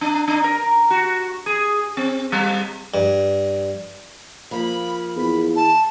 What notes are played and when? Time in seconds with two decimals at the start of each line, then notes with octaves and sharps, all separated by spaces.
0.01 D4
0.28 D4
0.44 A#4
0.90 F#4
1.46 G#4
1.97 C4
2.32 G3
2.94 G2
4.51 F3 A#3 B5
5.16 E2 B5
5.55 A5